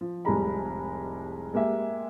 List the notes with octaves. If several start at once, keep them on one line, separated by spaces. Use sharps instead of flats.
F3
F1 C2 G3 G#3 A#5 B5
G#3 A#3 G4 E5